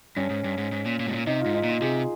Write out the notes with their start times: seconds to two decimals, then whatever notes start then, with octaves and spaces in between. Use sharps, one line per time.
0.17 G2 C#4
0.30 G#2
0.44 G2
0.58 G#2
0.72 G#2
0.86 A#2
1.00 A#2
1.07 G#2
1.13 A#2
1.27 C3 D#4
1.41 F4
1.46 G#2
1.55 D#4
1.64 A#2
1.69 F4
1.82 C3 G#4